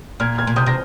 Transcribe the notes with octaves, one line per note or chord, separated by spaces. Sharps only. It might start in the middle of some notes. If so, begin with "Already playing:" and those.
A#2 F6 G#6
F6 G#6
A#2
C3 D#6 G6
C3 A#6